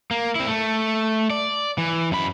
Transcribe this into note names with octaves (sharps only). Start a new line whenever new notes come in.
A#3
C4 E4
A3
D5
E3
F#2 B5